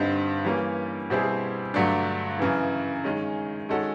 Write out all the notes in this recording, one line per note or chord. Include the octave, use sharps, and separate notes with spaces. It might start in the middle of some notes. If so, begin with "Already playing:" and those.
Already playing: G2 D3 G3 C4 D#4
E3 G3 A#3 C#4
B2 G3 C4 E4 G#4
G2 D3 F#3 A3 D4
F#2 C#3 E3
D#3 G#3 C#4
D#3 G#3 C#4 F#4 A4